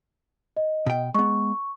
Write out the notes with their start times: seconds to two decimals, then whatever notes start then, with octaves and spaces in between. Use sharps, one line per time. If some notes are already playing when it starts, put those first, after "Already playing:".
0.57 D#5
0.86 B2 G5
1.14 G#3 B3 C#6